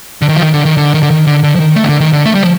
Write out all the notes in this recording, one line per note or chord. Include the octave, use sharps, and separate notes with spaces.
D3
D#3
F3
D#3
D3
D#3
D3
D#3
D3
D#3
D3
D3
F3
D#3
A3
D#3
D3
D#3
D3
A3
G3
F3